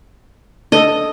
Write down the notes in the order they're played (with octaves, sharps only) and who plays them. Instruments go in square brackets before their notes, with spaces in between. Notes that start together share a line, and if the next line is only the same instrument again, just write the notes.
[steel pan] D4 A4 [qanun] D#5